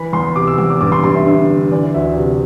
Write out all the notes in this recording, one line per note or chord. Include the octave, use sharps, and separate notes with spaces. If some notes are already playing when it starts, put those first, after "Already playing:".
Already playing: E3 B5
E2 C6
C3 D6
E6
E2 E6
D6
G2 D6
C6
G2 C6
E5
D3 E5
D3
E3 D5
D2 E5
C3